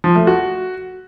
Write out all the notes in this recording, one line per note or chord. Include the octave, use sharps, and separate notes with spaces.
F3
A3
F#4